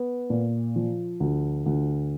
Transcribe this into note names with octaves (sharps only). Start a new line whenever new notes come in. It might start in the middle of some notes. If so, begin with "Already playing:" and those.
Already playing: B3
A#2
F3
D2
D2